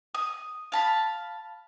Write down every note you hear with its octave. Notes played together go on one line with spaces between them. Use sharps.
D#6
F5 A5 B5